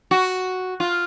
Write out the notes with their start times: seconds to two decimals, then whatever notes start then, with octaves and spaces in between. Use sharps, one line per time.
0.11 F#4
0.80 F4